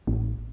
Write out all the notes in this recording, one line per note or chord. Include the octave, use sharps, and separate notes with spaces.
A1